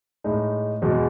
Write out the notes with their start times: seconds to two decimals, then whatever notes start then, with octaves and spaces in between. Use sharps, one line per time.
0.24 A2 G#3 D#4
0.82 E2 B2 G#3